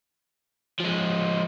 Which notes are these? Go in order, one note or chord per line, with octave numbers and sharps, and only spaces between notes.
F3 G#3